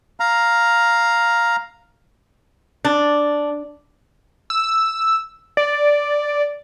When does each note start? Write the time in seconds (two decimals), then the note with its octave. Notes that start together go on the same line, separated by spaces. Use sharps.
0.20 F5 A#5
2.85 D4
4.50 E6
5.57 D5